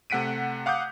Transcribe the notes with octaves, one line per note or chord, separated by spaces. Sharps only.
C3 A3 F#5 B6 D7 D#7
F5 F#5 D6 D#6 G6